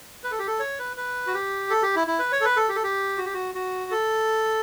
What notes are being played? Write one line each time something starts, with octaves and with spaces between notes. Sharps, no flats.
B4
A4
G4
A4
C#5
B4
B4
F#4
G4
A4
G4
E4
E4
B4
C#5
A4
B4
A4
G4
A4
G4
F#4
G4
F#4
F#4
A4